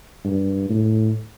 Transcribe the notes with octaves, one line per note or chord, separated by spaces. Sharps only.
G2
A2